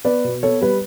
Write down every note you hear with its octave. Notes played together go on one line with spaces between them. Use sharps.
B3 B4 D5
B2
B3 A4 C#5
G3 B4